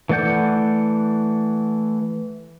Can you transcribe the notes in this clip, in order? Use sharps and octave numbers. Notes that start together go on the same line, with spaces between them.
E3 A3 D5 F#5 G6